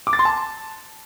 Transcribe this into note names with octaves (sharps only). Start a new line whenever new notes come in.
D6
A6
C6
A5